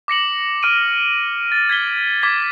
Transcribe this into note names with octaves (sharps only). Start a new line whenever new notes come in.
D6 A#6 C#7 F#7
D6 F6 D7 D#7
A6
G#6 B6 G7
D6 G#6 B6 G7